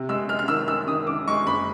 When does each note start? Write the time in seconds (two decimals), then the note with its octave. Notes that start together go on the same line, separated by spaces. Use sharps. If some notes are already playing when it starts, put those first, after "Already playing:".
Already playing: C3
0.09 G#3 E6
0.29 G#3 F6
0.39 F6
0.48 D#3 E6
0.68 G#3 E6
0.88 D#3 D#6
1.07 D#3 D6
1.27 G#3 C#6
1.47 F#1 B5